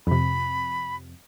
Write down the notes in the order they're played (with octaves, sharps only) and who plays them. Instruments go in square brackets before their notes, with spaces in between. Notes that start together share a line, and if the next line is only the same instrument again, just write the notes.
[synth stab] F2 C3 [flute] B5